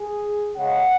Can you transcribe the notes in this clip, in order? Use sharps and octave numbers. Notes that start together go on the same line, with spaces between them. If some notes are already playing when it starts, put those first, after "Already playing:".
Already playing: G#4
C#3 G#3 F#5